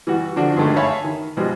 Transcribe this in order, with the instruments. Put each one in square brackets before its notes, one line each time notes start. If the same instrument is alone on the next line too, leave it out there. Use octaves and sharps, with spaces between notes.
[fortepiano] E3 G3 F#4
D3 F3 D4 F#4 A4
G2 D3 D#3 G#3 A3
C#5 E5 F5 G#5 A5 B5
D#3
G#2 B2 F3 G3 G#3